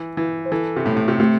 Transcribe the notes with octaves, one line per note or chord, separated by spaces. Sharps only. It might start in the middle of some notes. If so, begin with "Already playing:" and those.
Already playing: E3
E3
C5
E3 A4
C3
A2
A2
C3
C3 A3